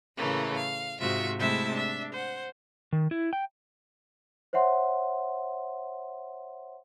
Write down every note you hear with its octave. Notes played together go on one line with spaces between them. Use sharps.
A2 C#3 E3 A3 A#3
F5
G#2 C3 F4 F#4 E5 C#6
C3 G#3 A3 E4 E5 A5
D4 E5
C5 F#5
D#3
E4
G5
C5 C#5 E5 F#5 C6